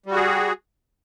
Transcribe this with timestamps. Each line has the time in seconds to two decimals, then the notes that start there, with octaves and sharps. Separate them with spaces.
0.06 G3
0.11 F#4
0.16 G#4